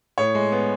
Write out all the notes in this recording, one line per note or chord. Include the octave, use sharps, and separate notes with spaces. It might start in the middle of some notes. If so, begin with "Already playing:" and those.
A2 C#5
G#3
B3